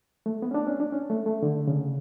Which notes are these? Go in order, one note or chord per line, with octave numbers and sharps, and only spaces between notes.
A3
B3
C#4
D4
C#4
D4
C#4
A3
A3
D3
C#3